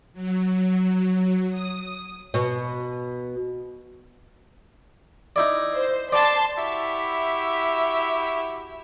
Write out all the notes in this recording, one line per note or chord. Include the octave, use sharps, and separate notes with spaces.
F#3
D#6
B2
D#4 E4 D5
C5
D5 A5 B5 C6
E4 F#4 G4 E5